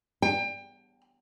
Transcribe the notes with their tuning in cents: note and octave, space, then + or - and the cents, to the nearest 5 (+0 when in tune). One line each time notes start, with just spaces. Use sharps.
G5 +30